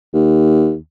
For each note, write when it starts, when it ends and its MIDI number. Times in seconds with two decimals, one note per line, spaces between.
0.14 0.75 39